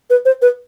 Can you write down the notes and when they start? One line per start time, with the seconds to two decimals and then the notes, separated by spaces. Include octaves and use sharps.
0.10 B4
0.25 C5
0.42 B4